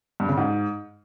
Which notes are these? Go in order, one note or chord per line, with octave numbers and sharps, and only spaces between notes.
G2
C#3
G#2